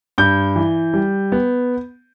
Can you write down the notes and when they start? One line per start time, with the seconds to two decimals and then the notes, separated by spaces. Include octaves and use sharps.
0.18 G2 G6
0.56 E3
0.94 G3
1.32 B3